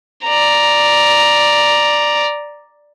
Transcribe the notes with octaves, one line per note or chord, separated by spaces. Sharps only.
D5 A#5